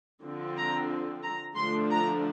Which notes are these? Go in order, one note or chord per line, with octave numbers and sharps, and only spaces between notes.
D3 F3 C4
A#5
A#5
D3 F3 A3 D4 C6
A#5